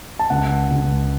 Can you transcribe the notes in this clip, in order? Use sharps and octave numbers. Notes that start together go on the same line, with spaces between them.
A5
C#2 F#5
C#2